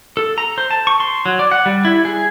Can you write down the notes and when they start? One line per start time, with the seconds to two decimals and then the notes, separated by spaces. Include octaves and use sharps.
0.17 A4
0.38 A#5
0.58 C5
0.71 A5
0.87 C#6
1.00 C6
1.26 F#3
1.39 D5
1.51 F#5
1.66 G3
1.85 E4
2.05 G#4